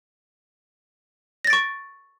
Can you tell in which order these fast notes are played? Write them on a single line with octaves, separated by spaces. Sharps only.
A#6 A6 D7 C#6